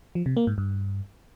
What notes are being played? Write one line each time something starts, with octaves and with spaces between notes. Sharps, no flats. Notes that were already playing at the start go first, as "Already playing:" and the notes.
F3
C3
A#3
G#2
G2